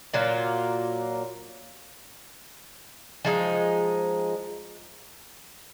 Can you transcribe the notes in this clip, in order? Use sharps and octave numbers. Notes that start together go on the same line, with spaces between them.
A#2 F#3 A#3 F4
F3 G#3 D#4